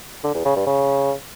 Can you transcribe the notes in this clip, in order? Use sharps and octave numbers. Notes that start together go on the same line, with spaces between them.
D3
E2
C#3
G2
C#3